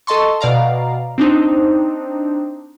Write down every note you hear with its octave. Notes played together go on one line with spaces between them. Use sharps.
A4 D#5 A5 C6 C#6
B2 D5 F5 A#5
C4 D4 D#4 C5